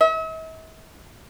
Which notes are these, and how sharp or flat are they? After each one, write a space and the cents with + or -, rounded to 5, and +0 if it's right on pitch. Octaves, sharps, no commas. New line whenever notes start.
E5 -45